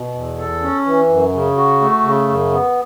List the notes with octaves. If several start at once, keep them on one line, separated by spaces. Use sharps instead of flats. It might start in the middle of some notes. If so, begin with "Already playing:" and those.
Already playing: B2
E2
A4
C#4
E3
F#2
C#3
F#4
A3
C#3
F#2
B3